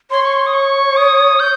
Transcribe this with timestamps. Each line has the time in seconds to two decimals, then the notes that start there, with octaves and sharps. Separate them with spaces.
0.11 C#5 C6
0.24 C#6
0.36 C6
0.47 D#6
0.54 C#6
0.97 D#6
1.40 G6